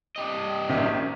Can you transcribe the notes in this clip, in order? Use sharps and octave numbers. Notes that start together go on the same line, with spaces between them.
D4 G4 D#5
A#1 F#2 D#3